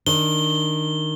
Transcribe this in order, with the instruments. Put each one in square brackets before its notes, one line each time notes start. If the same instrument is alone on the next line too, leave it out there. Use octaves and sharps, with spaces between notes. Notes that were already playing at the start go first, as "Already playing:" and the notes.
[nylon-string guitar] D#3 D4 [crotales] G7